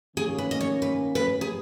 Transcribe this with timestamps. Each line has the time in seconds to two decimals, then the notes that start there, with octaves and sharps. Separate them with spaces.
0.17 D#3 A#3 C#4 G#4
0.38 B4
0.51 D#5
0.61 C#5
0.82 B4
1.15 B4
1.41 G#4